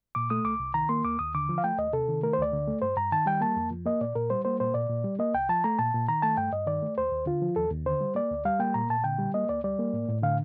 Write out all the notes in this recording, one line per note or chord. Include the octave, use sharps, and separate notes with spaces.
A#2 D6
A3 D#6
C2 D6
C2
D#3 A#5
A#3 C6
D#2 D6
D#2 D#6
D3 D6
F3
F5
A3 G5
D#2 D#5
C3 A4
D#3
A3 A#4
C5
D2 D5
D3
A3
G2 C5
G2 A#5
D#3 A5
G3 G5
A#3 A5
F2
F3
A#3 D#5
A#2 D5
A#2 A#4
G3 C5
A#3 C5
A#2 C5
A#2 D5
A#2
G3
A#3 D#5
C2 G5
F3 A5
A3 A#5
A#2 A5
A#2
D#3 A#5
A3 A5
G2 G5
G2 D#5
D#3 D5
A3
D#2 C5
D#2
D3 F4
F3
D#2 A4
D#2
D3 C5
G3
A#3 D5
D2
G3 F5
A#3 G5
A#2 A#5
A#2 A5
D3 G5
G3
A#3 D#5
D2 D5
G3 D5
A#3
A2
A2
D3 F5